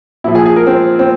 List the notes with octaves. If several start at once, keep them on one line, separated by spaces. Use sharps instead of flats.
A#2 F3 E4
G#4
G#4
A#4
C4
C4